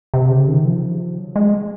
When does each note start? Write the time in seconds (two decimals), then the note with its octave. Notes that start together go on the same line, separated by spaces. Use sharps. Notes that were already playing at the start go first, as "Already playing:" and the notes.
0.14 C3
0.31 C#3
0.48 D#3
0.65 F3
1.18 F#3
1.36 G#3